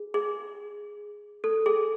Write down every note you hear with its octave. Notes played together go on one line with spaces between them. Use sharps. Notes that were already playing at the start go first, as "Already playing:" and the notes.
Already playing: G#4
G#4
A4
G#4